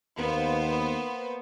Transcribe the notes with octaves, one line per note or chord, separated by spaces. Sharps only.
D#2 A#3 B3 C5 F5